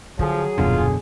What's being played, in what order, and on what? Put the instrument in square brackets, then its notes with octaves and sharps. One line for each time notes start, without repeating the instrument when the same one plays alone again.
[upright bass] D3 [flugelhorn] F3 [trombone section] F#3 G#4
[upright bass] D#1 [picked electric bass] F#2 B2 D3 [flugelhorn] F4